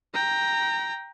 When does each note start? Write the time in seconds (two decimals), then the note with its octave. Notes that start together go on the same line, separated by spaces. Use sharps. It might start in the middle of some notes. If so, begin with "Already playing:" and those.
0.14 G5 A#5